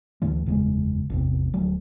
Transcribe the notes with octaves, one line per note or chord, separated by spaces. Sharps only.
D2 A2 E3 A3
F#1 E2 C#3 G#3
A1 E2 C3
D1 F3 F#3 A3